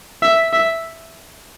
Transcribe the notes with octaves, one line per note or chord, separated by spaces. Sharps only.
E5
E5